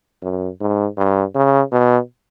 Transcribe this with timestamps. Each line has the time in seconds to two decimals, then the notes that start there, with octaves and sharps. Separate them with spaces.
0.23 F#2
0.61 G#2
0.98 G2
1.35 C#3
1.72 B2